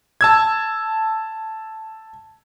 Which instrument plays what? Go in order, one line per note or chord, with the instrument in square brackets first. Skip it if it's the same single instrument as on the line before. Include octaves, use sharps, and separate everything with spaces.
[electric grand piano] A5 E6 G#6